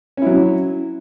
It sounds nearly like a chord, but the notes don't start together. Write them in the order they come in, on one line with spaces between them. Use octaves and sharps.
C#4 E4 F#3